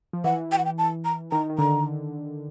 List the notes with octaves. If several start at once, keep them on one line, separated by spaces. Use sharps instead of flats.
F3
E3 F#5
G5
F#5
G5
A5
A#5
D#3 A#5
D#3
D3 A#5